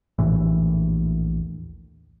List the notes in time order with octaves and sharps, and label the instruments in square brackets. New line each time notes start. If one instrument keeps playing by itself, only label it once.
[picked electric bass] A#1 D#2 A2 E3